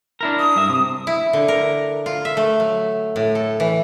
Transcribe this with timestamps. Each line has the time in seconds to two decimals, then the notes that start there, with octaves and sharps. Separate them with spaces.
0.21 D4 E4 A#4
0.39 D#6
0.56 G2 E5
0.69 C3
1.07 E4
1.33 D3
1.48 A#4
2.06 F4
2.25 E5
2.37 A3
2.60 F#3
3.16 A2
3.35 A4
3.60 E3